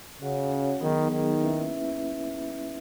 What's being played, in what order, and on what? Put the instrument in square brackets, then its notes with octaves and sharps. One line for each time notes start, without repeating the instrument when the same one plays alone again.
[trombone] C#3 [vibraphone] C#4 F#4 C#5 F#5
[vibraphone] C#4 F#4 C#5 F#5
[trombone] D#3 [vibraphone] F#3 B3 D#4 G#4
[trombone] D#3 [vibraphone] F#3 B3 D#4 G#4
[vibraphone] A#3 C#4 E4 B4 E5
A#3 C#4 E4 B4 E5